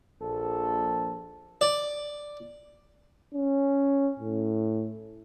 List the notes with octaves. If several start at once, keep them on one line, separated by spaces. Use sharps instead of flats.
A#1 A4
D5
C#4
A2